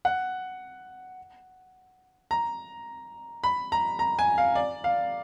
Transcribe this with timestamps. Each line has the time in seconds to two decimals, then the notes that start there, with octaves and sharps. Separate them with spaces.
0.05 F#5
2.31 A#5
3.44 B5
3.72 A#5
3.99 A#5
4.19 G#5
4.38 F5
4.55 D5
4.84 F5